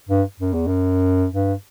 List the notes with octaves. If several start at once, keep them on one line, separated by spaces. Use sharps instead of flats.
G2
F#2
E2
F#2
G2